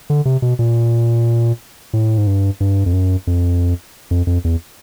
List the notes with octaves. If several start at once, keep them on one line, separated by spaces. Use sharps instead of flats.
D3
C3
B2
A#2
A2
G#2
G2
G2
F2
F#2
F2
F2
F2
E2